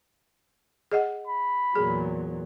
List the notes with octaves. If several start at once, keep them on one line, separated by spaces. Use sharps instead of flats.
G#4 D#5 F#5
B5
E2 A#2 F#3 G#4